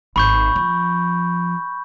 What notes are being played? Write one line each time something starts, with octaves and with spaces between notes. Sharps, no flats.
G#1 B5 C#6 G6
F3